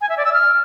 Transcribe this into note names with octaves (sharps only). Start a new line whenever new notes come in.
G#5
E5
D5
E6
F6